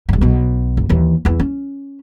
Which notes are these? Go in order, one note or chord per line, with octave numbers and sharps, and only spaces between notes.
E1 G2
B1 B2
F#1
D#2 E3
E2 E3
C#4